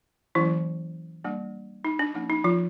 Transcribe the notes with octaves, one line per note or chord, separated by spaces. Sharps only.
E3 F#3 A#3 C#4 E4
G3 A#3 D4
D#4
D4
F3 A#3 C#4 D#4
D#4
F3 F4